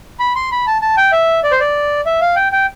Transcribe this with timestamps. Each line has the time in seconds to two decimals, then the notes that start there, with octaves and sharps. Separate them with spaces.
0.19 B5
0.36 C6
0.52 B5
0.67 A5
0.82 A5
0.97 G5
1.12 E5
1.44 D5
1.52 C5
1.60 D5
2.06 E5
2.21 F5
2.36 G5
2.52 G5